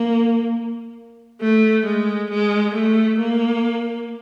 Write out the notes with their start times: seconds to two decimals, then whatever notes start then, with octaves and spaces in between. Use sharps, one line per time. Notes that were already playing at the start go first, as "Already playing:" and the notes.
Already playing: A#3
1.41 A3
1.86 G#3
2.30 G#3
2.74 A3
3.19 A#3